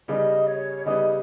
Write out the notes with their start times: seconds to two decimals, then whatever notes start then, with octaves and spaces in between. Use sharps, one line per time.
0.08 C#3 G3 B3 D#4 D#5
0.46 C#5
0.85 C#3 G3 B3 D#4 D#5